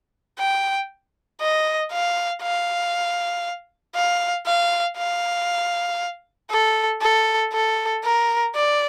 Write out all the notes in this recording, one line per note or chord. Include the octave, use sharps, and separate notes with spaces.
G5
D#5
F5
F5
F5
F5
F5
A4
A4
A4
A#4
D5